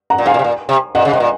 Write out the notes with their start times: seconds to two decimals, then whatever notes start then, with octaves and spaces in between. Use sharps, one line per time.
0.10 F#5 A#5
0.18 A#2
0.26 G#2 F5 G#5
0.34 A#2
0.39 C3
0.44 A#2
0.69 C3
0.95 A#2 D#5 F#5
1.05 C#3
1.12 C3 D#5 F#5
1.20 A#2